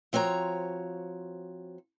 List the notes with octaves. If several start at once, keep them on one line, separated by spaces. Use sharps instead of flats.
F3 C4 F#4 C#5 A#5